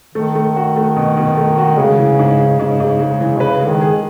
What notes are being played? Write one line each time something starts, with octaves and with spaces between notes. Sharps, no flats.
D#3 A3
A3
F#4
A3
B2
B2
A3
F#4
C#3 G#3
E3
G#2
G#2
G#2 C#3
G#2
G#3
E3
B2
C#3 B4
G#3
D#3
G#4